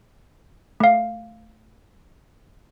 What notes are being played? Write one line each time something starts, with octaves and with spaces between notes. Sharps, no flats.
A3 F5